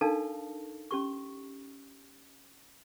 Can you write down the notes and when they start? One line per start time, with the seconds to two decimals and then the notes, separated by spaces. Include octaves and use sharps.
0.01 D4 D#4 A4 A#4 F5 A5
0.91 C#4 G4 C#6